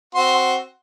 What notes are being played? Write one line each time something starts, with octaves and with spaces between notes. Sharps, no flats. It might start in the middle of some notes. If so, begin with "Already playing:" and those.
C4 F#4 C6